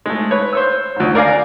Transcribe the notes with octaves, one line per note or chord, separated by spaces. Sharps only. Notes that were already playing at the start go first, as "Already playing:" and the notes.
G#3 A3
B4 C#5
C5 C#5 E6
D2 G#2
A#4 D5 F5 G#5 A#5